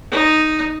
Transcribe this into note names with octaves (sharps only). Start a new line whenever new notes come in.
D#4